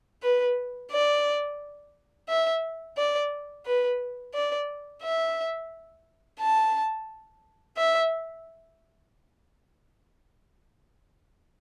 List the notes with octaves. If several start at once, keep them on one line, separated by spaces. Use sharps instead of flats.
B4
D5
E5
D5
B4
D5
E5
A5
E5